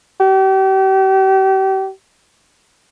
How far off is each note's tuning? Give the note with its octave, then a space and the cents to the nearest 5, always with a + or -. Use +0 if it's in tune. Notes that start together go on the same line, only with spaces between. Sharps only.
G4 -35